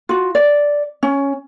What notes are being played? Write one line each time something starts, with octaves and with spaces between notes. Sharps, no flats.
F4 F#4
D5
C#4